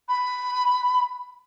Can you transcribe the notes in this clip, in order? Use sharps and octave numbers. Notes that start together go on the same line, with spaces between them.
B5